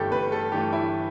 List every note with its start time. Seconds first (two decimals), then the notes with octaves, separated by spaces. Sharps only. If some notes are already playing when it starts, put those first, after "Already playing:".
Already playing: G1 G2 E3 A3 G4 A4
0.11 G1 B4
0.32 A4
0.52 G2 E3 A3 G4
0.73 E4